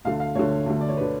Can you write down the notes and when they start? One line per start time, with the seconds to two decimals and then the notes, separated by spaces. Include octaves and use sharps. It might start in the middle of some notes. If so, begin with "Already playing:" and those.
0.05 D2 D3 F5
0.20 F5
0.35 D2 D3 C#5
0.66 D2 D3
0.81 D5
0.89 C#5
0.97 B4
1.01 D3